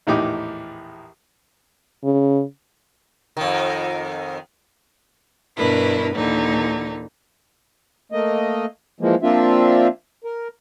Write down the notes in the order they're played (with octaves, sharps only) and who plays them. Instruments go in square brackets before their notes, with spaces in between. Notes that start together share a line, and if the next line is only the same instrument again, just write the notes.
[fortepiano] A#1 E2 A2 D#4 G4 D6
[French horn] C#3
[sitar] F2 D#3
[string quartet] G2 B2 D4 E4 A#4 B4
D#2 A#2 D3 E3 D#4
[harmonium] A3 A#3 D#5
E3 F3 G#3 A#3
F3 A#3 C4 D4 F4 E5
A#4